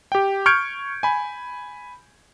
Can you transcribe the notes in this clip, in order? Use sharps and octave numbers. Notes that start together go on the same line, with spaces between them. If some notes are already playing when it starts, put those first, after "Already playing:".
G4 G5
C#6 F6 G6 G#6 C#7 D7
G#5 B5